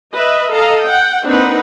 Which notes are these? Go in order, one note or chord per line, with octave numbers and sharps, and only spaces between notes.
B4 D#5 E5
A4 D#5 F5 A#5
F#5 G5
A#3 C4 D4 D#4 B4 F#5